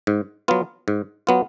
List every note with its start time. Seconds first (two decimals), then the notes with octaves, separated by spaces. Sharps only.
0.07 G#2
0.48 F#3 B3 F4
0.88 G#2
1.27 F#3 B3 F4